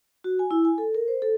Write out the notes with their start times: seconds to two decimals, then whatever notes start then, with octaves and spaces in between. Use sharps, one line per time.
0.24 F#4
0.39 G#5
0.51 E4
0.65 G#5
0.78 A4
0.95 A#4
1.08 C5
1.22 A4